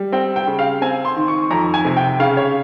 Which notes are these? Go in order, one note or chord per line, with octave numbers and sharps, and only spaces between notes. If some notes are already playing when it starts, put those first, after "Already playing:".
Already playing: G3
C4 G5
G5
C#3
F5
C4 G#5
C6
D#3
C#6
F2 A#5
G#5
C3
G5
C#3 F5
C#5